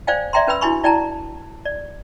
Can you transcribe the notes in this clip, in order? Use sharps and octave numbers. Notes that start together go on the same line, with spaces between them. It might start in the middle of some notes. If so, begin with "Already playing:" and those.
C5 D5 F5 G5 G#5
D5 E5 G5 A#5 C6
C#4 B4 G5 B5 E6
D4 E4 F#4 G#5 B5 C#6
E4 D5 G5 A5 A#5
D5